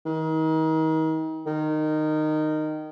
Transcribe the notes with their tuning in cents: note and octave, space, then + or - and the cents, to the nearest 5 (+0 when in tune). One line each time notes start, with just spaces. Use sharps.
D#3 +35
D#3 -15